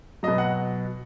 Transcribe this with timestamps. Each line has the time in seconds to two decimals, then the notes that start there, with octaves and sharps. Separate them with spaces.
0.23 B2 F#3 D#5
0.38 F#5